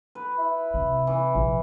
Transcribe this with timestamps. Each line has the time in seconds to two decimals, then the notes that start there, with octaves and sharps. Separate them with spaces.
0.15 B4
0.38 E4
0.74 C3
1.07 E3
1.35 A#1